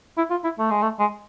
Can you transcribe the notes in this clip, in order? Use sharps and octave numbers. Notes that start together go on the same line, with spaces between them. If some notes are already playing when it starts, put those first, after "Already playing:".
E4
F4
E4
A3
G#3
A3
G#3